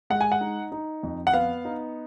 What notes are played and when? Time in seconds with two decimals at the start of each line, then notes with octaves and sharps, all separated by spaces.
0.10 G#3 F#5
0.21 G#5
0.32 F#5
0.41 D#4
0.72 D#4
1.03 F2
1.27 F#5
1.33 B3 F5
1.65 D#4